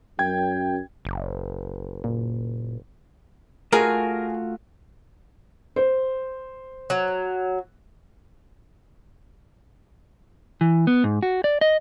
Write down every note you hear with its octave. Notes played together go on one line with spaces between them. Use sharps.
F#2 G5 G#6
F#1
A#2
A3 F4 F#4 G#4 A#4 G#5
C5
F#3
E3
B3
G#2
F#4
D5
D#5